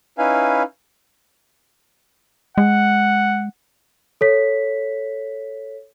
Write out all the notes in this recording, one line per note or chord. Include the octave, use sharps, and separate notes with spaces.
C#4 D#4 E4 B4 F5 G#5
G#3 F#5
A4 C#5 B6